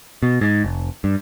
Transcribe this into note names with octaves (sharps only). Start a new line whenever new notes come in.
B2
G#2
F1
G2